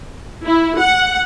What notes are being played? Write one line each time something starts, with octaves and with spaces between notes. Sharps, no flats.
E4
F#5